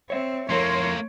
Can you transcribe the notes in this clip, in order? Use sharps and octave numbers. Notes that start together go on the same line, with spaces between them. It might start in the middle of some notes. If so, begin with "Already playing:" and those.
C4 C#5 E5
F2 A3 A#3 E4 A#4 C#5 C6